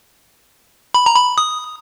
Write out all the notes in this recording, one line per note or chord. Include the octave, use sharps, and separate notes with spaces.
B5
A#5
B5
D#6